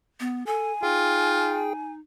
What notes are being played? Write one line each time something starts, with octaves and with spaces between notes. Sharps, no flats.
B3
A4 G#5
D#4 F4 G#4 G5